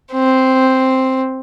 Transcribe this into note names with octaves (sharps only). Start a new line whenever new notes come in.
C4